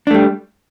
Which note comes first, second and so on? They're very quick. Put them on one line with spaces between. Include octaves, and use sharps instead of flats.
D4 A3 G3